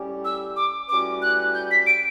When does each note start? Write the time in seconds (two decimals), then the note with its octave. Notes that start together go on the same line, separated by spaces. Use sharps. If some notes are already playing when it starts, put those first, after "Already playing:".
Already playing: A2 G3 C#4 G4
0.25 E6
0.56 D6
0.89 A2 G3 C#4 F#4 B4 D6
1.22 F#6
1.54 G6
1.71 B6
1.87 D7